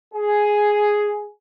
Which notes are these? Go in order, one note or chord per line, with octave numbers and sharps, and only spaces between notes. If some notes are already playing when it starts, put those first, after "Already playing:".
G#4